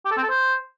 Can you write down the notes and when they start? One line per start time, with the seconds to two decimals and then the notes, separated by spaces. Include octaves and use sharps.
0.05 G4
0.11 A4
0.17 C4
0.23 A4
0.29 C5